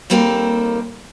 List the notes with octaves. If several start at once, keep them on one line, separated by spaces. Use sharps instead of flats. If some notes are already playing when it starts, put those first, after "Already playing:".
D#2 G3 A#3 C4 A4